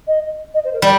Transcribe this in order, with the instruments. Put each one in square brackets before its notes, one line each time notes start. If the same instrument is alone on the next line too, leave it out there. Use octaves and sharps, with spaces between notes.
[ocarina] D#5
D#5
C5
A#4
[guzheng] G3 [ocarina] D5